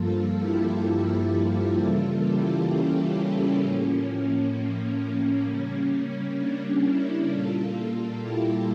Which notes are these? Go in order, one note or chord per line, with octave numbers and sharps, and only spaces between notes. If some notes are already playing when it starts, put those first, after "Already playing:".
Already playing: G2 F3 A#3 F4 A4
E4 G4
F4 A4
F4 A4
C#3 E3 G3 A#3
E4 G4
C#4 E4
C#4
A2 F3 A#3
A#3
C#4
C#3 G3 A#3
A#3 D4
C#4 E4
A#2 G3 A#3 F4 A4
E4 G4